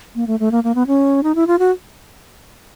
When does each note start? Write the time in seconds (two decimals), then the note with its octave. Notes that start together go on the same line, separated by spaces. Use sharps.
0.15 A#3
0.27 A3
0.40 A3
0.51 A#3
0.64 A#3
0.75 B3
0.87 C#4
1.23 D#4
1.35 E4
1.47 F4
1.59 F#4